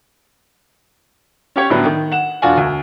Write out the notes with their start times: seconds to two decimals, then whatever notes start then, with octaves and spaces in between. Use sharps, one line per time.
1.56 C#4 G4 C#5
1.70 A2 D3 F#3 G3 B3
1.85 D#3
2.12 F#5 E7
2.42 E1 D4 F4 F#4 F#5 G#5
2.57 D2